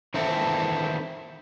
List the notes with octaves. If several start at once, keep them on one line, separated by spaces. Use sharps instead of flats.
D#3 E3 C4 E4 A4